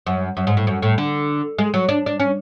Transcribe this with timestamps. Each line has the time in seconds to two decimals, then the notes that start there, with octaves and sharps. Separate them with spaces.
0.07 F#2
0.37 F#2
0.47 G#2
0.57 A2
0.67 F#2
0.82 A2
0.98 D3
1.59 G#3
1.74 F#3
1.89 D4
2.06 D4
2.20 C#4